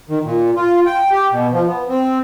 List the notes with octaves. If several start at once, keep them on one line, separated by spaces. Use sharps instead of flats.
D#3
A#2
F4
G5
G4
B2
F3
B3
C4